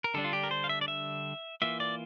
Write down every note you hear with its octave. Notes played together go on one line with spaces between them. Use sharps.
A#4
D3 G3 D4 A4
F4
G4
A#4
C5
F5
E5
D5
E5
E3 A#3 F4 E5
D5